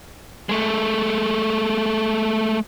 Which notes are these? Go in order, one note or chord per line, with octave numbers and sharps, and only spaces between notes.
G#3 A3